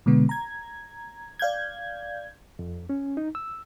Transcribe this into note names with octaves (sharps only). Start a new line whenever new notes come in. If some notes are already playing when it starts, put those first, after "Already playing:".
B2 D3 G#3 B3
A#5 G#6
D5 F5 G6 G#6
F2
C#4
D#4
E6